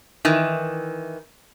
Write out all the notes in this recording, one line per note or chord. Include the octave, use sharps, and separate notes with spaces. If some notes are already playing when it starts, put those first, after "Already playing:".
D#3 E3